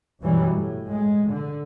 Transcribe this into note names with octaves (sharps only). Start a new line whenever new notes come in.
G1 F#2 B2 E3 F#3 G3
A2
G#3
D3